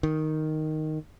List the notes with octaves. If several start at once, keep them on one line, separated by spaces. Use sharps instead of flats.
D#3